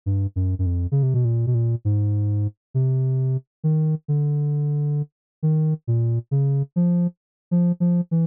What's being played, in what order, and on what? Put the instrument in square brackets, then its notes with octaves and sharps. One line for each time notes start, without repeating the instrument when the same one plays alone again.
[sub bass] G2
F#2
F#2
F2
C#3
C3
B2
A#2
B2
A#2
G#2
C3
D#3
D3
D#3
A#2
C#3
F3
F3
F3
E3